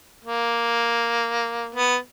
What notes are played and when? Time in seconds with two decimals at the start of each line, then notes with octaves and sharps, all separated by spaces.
0.25 A#3
1.75 B3